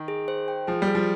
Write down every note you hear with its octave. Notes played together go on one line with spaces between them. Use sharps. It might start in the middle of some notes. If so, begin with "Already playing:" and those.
Already playing: D#3
G#4
C5
G5
F3 G#4
G3
G#4
F3